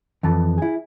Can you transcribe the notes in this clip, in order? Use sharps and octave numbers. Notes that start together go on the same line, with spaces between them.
F2 E3 A5
E4 G#4